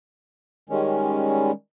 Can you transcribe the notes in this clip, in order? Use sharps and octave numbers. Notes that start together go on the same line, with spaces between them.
D#3 G3 G#3 C#4